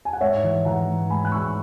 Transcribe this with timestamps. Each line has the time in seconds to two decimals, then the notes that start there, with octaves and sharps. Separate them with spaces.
0.05 G#5
0.13 F#5
0.20 G#2 C#5 E5
0.44 E3
0.65 E3 F#5 A#5
0.88 G#2
1.10 G#2 G#5 B5
1.25 F#6
1.31 G#2 C#6 E6